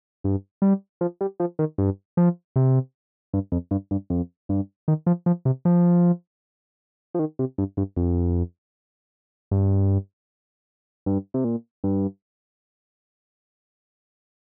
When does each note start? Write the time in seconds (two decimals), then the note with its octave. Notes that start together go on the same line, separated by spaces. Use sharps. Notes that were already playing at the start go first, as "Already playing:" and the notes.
0.24 G2
0.62 G3
1.01 F3
1.21 G3
1.40 F3
1.59 D#3
1.78 G2
2.17 F3
2.56 C3
3.33 G2
3.52 F2
3.71 G2
3.91 G2
4.10 F2
4.49 G2
4.88 D#3
5.07 F3
5.26 F3
5.45 C3
5.65 F3
7.14 F3
7.19 D#3
7.39 C3
7.58 G2
7.77 G2
7.97 F2
9.51 G2
11.06 G2
11.34 C3
11.44 A#2
11.84 G2